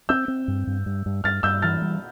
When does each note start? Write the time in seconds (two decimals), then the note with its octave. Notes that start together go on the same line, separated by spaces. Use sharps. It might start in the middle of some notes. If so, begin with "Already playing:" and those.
0.09 C4 E6 G6
0.28 C4
0.48 G2
0.67 G2
0.86 G2
1.06 G2
1.24 G2 F6 A6
1.43 G2 E6 G6
1.62 E3 F6 A6
1.82 G3